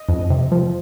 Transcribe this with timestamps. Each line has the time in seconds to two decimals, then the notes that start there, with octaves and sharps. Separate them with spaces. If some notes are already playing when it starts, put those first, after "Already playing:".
Already playing: D#5
0.09 F2
0.30 C3
0.52 F3